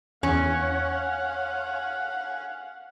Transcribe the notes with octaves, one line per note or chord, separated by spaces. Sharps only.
E2 C#4 F5 F#5